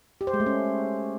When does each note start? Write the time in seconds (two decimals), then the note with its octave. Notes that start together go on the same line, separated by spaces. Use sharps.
0.21 G4
0.27 C5
0.34 G#3
0.40 A3
0.46 C#4